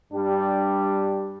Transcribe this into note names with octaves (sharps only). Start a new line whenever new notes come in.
G2 G3 D4 G4